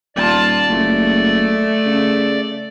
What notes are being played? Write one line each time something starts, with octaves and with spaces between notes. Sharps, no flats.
D#1 F4 D5 A5
F#1 A3
C#3